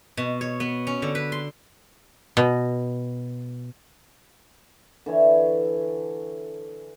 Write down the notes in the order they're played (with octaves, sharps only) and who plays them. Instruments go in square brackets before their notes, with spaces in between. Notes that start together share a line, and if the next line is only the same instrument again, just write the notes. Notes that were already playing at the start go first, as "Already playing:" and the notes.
[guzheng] B2
C#5
B3
C#4
D3
B4
C6
[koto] B2
[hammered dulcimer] D3 E3 C#5